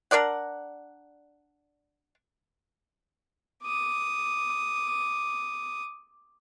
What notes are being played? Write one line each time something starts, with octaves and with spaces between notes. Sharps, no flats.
D4 A#4 D5 F#5
D6 D#6